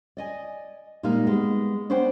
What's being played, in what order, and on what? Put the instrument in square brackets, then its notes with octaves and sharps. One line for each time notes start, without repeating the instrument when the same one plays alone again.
[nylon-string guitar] D5 D#5 G#5
A#2 G3 G#3 A#3 D#4 F5
G#3 B3
B3 C#4 D4 C5 F#5 G5